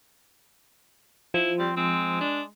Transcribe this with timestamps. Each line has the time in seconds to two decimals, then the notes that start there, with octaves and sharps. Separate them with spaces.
1.34 F3 E4
1.59 G3 C4
1.76 G#3 C4
2.21 D4